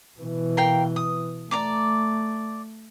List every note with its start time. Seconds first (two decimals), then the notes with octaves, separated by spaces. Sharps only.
0.20 B2 E3
0.57 A#4 F5 G5
0.96 D#6
1.51 A3 D5 A#5 D6